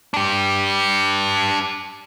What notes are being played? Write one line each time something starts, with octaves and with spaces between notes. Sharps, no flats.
D4 G4